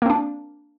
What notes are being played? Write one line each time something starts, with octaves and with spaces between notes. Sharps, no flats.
A#3 C4 D4